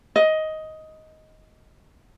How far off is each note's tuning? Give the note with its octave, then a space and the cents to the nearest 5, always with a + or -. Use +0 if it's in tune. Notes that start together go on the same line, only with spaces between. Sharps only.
D#5 +10